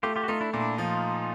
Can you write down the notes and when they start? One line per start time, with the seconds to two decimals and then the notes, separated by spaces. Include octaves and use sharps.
0.03 A3 F4 G4
0.16 F4 G4
0.24 F#4
0.28 A3 D#4 F4
0.41 D4 E4
0.53 A#2 D4 E4
0.78 F3 D#4 F4